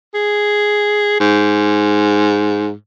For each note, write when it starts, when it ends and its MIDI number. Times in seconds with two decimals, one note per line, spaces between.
0.14 1.18 68
1.20 2.72 44